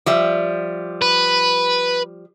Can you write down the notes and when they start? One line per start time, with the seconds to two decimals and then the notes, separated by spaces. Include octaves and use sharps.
0.06 F3 G3 E5
1.02 B4